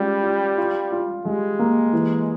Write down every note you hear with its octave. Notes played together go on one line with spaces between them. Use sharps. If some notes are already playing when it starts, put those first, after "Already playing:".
Already playing: G3 G#3 C#4 F4
F4
F4
F4
G3 G#3
A#3
E3